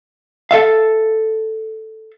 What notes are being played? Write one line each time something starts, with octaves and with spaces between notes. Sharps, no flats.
A4 E5 F5